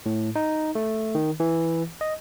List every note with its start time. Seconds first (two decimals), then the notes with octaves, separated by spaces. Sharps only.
0.06 A2
0.36 D#4
0.75 A3
1.15 D#3
1.40 E3
2.01 D#5